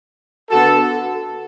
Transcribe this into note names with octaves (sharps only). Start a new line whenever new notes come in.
D3 B3 F#4 A4